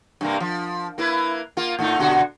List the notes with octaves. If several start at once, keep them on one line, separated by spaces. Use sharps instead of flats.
G2 C3 A#3
F3
A#3 E4 B4
A#3 F4
A2 A3 D#4
B2 D3 F#4